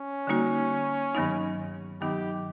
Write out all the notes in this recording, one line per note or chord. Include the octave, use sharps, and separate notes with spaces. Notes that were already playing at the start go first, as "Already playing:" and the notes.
Already playing: C#4
D3 G3 A#3 D#4 F#4
G2 D#3 F#3 B3 D#4
G2 D#3 F#3 B3 D#4 G4